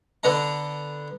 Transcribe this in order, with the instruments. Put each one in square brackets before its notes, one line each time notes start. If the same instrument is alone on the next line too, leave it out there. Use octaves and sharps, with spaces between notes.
[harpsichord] D3 B3 D4 A#5